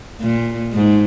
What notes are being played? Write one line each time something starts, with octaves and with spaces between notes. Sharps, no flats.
A#2
G#2